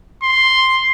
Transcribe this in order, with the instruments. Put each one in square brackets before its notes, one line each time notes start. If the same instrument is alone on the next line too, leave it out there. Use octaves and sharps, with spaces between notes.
[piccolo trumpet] C6